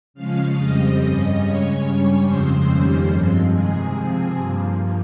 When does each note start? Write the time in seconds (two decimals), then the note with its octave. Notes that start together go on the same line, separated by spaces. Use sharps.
0.14 C#3 F3 G#3 C#4 F5
0.56 F2 C#3 G3 C4 D#5
0.99 G2 G3 C#4
1.40 C#3 G#3 C#4 C#5
1.82 G2 G3 C#4
2.24 F2 C#3 F3 G#3 C4 C5
2.66 F2 D#3 G3 A#3 C#4
3.08 G2 F3 G#3 C4
3.50 C3 D#3 G#3 G#4
3.92 C3 F3 C4
4.34 G2 F3 A#3